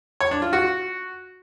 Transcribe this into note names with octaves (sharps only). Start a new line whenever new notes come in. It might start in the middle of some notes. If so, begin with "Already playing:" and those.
C#5
D4
F4
F#4